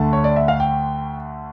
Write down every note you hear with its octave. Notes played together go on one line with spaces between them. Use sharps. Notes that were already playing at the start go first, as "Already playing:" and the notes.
Already playing: D2 D3 A3 A5
C#5
D5
E5
F5
G5